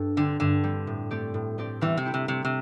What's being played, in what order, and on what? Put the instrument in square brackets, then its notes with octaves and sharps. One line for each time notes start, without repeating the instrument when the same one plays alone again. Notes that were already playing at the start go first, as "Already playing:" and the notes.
Already playing: [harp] G2 D4 A4
[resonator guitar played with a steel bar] D3 [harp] G3 C4
[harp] G2 [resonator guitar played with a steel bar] D3
[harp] G3 C4
A2
A3 C4 G4 D5
A2
A3 C4 G4 D5
[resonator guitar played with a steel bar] E2 E3 [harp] G3
[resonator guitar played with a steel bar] C3
[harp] C4 E4 G4
[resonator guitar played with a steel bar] C3
[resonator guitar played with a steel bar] C3 [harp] G3
[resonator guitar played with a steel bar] C3